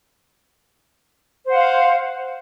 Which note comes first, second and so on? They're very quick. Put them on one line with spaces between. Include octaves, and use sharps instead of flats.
C5 F#5 F5